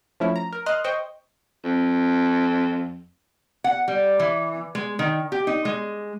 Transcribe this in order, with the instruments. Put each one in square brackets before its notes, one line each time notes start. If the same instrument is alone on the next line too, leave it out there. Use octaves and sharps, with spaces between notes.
[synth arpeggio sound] F3 A3 C#4 E4
A#5
A#4
D#5 C6 F6 F#6
C5 D#5 G5 C#6
[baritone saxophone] F2
[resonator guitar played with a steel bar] F#5
G3
E3
G#3
D#3
G4
D#4
G#3